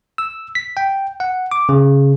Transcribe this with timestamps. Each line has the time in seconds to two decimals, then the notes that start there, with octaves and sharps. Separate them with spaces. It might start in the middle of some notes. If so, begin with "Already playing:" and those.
0.18 E6
0.55 B6
0.77 G5
1.20 F#5
1.51 D6
1.69 C#3